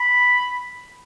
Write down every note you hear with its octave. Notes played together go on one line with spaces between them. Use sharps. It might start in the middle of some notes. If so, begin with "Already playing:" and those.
Already playing: B5